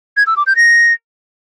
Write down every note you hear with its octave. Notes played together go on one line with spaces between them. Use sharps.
G#6
E6
D6
G6
A#6